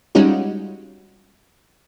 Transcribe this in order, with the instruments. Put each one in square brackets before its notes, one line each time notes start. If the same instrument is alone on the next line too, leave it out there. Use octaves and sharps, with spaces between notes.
[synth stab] G3 G#3 C#4 D#4 F4 F#4